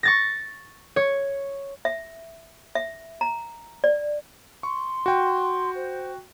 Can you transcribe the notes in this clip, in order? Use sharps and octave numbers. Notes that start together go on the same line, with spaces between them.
C#6 A6 A#6
C#5
E5
E5
A#5
D5
C6 C#6
F#4 G5
C5